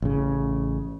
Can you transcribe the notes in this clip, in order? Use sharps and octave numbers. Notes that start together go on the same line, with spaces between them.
A1 C#3